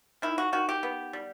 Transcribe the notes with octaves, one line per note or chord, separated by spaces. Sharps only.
D#3 E4
F#4
D#3 F#4
G4
B3
G3